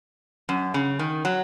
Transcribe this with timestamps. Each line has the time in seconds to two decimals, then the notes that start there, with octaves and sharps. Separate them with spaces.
0.49 F#2
0.74 C#3
0.99 D#3
1.25 F#3